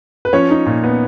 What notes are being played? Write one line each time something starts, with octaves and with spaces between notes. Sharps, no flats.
B4
F3 C#4 C#5
D#4
A#2
B3